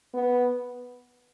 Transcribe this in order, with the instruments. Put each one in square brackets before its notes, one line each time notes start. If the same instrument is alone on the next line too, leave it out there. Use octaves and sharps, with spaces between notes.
[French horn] B3